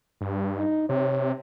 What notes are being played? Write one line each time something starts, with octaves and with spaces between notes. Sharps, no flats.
G2
D#4
C3 C#5